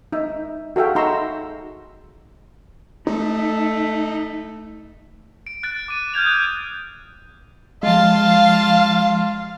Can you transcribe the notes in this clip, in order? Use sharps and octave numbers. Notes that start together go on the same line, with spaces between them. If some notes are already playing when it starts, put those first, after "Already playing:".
D#4 E5
F#4 G#4 A4 E5 F5 G5
D#4 F#4 A#5 C6 C#6 E6
A3 D#4
D7
F#6 A6 D7
D6 D#7
F6 G6 G#6 F7
D#6 F#6
F3 G#3 F4 F5 A5